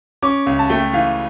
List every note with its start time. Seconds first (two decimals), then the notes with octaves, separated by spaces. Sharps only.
0.23 C#4 D6
0.46 C#2
0.59 A5
0.70 A3 G5
0.93 E3 F5